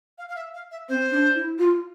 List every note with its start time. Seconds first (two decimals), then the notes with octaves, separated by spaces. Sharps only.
0.18 F5
0.29 F5
0.36 E5
0.54 F5
0.71 E5
0.89 C4 C5
1.11 D4
1.35 E4
1.59 F4